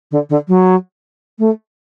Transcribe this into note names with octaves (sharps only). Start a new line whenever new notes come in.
D3
D3
F#3
A3